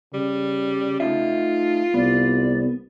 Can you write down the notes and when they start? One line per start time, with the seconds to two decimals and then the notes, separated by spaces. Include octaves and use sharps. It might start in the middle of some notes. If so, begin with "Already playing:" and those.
0.14 C#3 G3
1.00 A3 D#4 F4 E5
1.94 C2 B3 D5